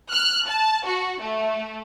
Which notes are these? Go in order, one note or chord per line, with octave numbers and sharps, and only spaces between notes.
F6 F#6
A5
F#4
A3